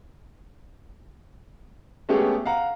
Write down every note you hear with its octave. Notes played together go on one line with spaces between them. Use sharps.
G#3 A3 B3 C#4 G4 G#4
F5 F#5 A#5